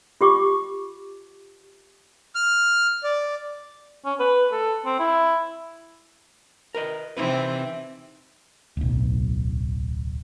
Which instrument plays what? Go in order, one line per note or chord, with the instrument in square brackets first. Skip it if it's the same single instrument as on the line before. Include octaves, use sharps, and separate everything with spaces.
[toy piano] F4 G4 C#6 D6
[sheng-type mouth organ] F6
D5
[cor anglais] C#4
B4
A4
C4
E4
[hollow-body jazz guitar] A#4 B4 D#5
[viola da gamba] C3 E3 C4 [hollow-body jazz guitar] D#4 E4 B4
[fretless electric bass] D1 B1